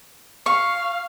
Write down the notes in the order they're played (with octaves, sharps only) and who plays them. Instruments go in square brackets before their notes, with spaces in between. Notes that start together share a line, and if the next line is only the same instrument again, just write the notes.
[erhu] F5 [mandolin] C#6